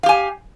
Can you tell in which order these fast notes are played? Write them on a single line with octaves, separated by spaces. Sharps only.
F5 G4 G#5